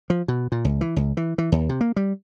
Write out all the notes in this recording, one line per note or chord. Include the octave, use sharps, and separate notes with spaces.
F3
B2
A#2
C#2
E3
C#2
E3
E3
D#2
C3
A#3
G3